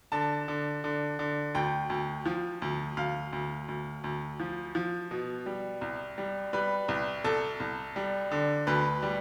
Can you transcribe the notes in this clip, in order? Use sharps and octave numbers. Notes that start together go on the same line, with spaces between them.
D3 A5
D3
D3
D3
D2 G5
D2
F3
D2
D2 F5
D2
D2
D2
F3
F3
B2
G3
C2
G3
G3 B4
C2
C2 A4
C2
G3
D3
D2 B4
G3